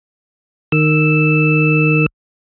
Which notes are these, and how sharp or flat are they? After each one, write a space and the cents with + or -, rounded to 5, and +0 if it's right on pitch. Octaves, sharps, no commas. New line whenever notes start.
D#3 -15 E6 +0